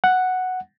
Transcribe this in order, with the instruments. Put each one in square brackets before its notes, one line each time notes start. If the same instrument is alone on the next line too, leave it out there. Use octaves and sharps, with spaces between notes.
[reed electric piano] F#5